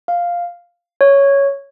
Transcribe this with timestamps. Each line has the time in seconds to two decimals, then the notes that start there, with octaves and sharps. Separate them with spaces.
0.08 F5
1.01 C#5